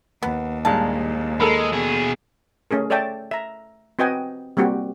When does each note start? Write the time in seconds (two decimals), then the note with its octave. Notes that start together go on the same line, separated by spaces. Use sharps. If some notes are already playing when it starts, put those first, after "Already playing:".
0.22 D#2 B3
0.65 G2 A#2 G#3 A5
1.40 G#3 A4 A#4 B5
1.73 B2 G#4
2.71 A3 C#4 G#4 A#4
2.90 A4 C#5 D5 E5 G5 A5
3.31 E5 A#5
3.99 C4 F#4 B4 D#5 G5 G#5
4.57 G3 A#3 C4 F#4 G4